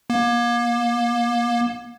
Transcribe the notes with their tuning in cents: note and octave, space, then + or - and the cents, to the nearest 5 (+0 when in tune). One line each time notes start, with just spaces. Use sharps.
A#3 +35